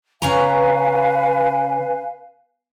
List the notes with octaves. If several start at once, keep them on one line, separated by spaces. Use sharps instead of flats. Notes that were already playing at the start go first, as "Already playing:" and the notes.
C#3 C#4 B4 F5 G#5 A#5